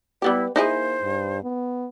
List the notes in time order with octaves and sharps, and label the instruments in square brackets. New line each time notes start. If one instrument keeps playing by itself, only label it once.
[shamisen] G3 B3 G4 [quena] E4 [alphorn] B4
[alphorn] A#3 [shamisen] D#4 E4 G#4 [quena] C5
[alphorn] G2
B3